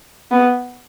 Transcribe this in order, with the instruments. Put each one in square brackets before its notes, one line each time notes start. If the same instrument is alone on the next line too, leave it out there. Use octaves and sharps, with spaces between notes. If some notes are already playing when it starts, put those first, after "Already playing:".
[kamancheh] B3